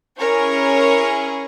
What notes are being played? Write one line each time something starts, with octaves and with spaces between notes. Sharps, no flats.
C#4 E4 G#4 A#4 C#5